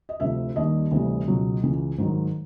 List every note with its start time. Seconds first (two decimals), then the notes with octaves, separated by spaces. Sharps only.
0.09 D#5
0.20 D2 C3 F3 E5
0.56 D#2 D#3 G3 D#5
0.91 D2 C3 E3 G3
1.27 C#2 B2 F#3
1.63 C#2 C#3 E3
1.98 G#2 D#3 F#3